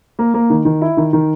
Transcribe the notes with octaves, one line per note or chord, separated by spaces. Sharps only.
A#3
A#3
D#3
D#3
E4
D#3
D#3